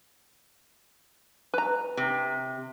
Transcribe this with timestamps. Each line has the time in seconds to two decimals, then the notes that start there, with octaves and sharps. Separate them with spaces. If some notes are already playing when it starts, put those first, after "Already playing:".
1.54 B4 A#5
1.97 C3